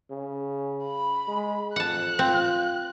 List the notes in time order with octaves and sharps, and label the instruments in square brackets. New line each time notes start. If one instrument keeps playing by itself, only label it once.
[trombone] C#3
[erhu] B5
[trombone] G#3
[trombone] F2 [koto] F#5 A5 [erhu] F#6
[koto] C4 [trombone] F4